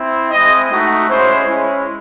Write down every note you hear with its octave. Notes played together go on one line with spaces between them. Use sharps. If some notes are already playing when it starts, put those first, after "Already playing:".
Already playing: C4 E4
G#3 C4 E4 D#5
A3 D#4 F#4
G#3 C#4 E4 C5
G#3 C#4 E4